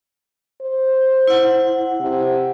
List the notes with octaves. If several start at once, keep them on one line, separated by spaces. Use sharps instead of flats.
C5
E4 F#5
C3